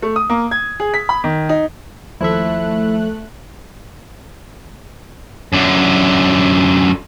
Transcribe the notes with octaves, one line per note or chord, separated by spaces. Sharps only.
A3
D#6
A#3
G#6
G#4
B6
B5
D#3
D#4
D#2 F3 A3 E4 A4 C5 E5 F#6
F#2 D3